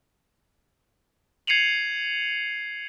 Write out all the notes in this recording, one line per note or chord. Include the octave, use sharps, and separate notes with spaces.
G#6 C7 C#7 D#7 F7 F#7